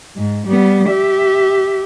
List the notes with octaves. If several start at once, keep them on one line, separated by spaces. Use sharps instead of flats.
G#2
G3 B3
G4 E5